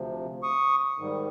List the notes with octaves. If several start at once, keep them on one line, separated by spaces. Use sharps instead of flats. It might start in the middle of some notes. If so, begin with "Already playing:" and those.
Already playing: D2 C3 F3
C#6 D#6
G#2 D#3 G3